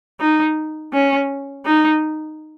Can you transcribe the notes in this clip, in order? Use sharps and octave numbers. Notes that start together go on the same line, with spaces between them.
D#4
C#4
D#4